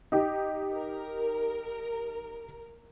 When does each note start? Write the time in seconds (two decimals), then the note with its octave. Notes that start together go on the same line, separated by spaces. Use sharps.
0.12 D#4 G4
0.73 A#4